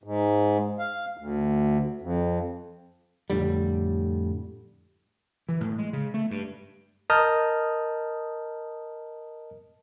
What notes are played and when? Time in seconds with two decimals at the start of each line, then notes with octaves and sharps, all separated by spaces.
0.04 G#2
0.79 F5
1.18 D2
2.02 F2
3.30 F2 A2 D3 G3
5.49 E3
5.61 A2
5.78 G#3
5.93 C#3
6.14 A3
6.31 G2
7.10 A#4 D#5 A5 D#6 F6 G6